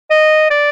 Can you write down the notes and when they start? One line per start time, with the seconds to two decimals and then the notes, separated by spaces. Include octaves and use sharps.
0.11 D#5
0.51 D5